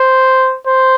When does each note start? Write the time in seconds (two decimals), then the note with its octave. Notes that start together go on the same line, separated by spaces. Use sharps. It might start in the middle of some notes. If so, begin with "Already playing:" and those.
Already playing: C5
0.66 C5